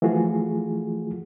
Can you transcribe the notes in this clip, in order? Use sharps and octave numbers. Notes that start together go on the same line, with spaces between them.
E3 F3 A3 F4 F#4 G#4